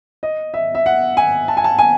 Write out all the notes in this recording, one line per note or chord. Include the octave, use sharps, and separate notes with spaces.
D#5
E5
E5
F#5
G#5
A5
G#5
A5
G#5